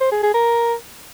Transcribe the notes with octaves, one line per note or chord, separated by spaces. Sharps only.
C5
G#4
G#4
A#4